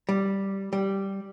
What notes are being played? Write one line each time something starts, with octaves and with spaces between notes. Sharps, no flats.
G3
G3